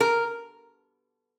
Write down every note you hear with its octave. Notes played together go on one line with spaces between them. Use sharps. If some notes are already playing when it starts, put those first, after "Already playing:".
A#4